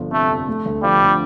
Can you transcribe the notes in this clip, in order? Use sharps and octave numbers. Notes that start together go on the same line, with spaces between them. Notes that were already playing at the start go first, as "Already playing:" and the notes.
Already playing: G1 F3
C3 A3
F2
A3
D2
F3 G3
D3